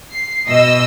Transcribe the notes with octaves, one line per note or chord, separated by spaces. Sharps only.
C7
B2 D#5 E6